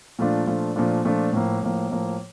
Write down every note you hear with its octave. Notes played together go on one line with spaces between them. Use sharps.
A#2 F3 A3 D4 F4
A#2 F3 A3 D4 F4
A#2 F3 A3 D4 F4
A#2 F3 A3 D4 F4
A2 F3 A#3
A2 F3 A#3
A2 F3 A#3